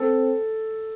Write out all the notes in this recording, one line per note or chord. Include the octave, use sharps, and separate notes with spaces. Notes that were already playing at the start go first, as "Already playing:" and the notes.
Already playing: C4 A4